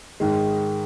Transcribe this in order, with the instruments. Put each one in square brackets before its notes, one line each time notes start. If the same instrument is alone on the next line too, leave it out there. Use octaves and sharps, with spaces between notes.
[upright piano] G#2 D#3 G#3